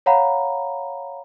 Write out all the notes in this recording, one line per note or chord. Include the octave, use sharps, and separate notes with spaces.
C#5 F5 F#5 A#5 B5